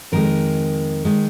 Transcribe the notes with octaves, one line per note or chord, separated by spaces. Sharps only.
F2 D#3 G#3 A#4
D#3 G#3